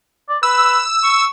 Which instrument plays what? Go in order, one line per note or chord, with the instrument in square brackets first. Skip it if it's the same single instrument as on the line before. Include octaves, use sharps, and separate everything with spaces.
[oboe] D5
[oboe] B4 [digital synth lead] E6
[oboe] C#6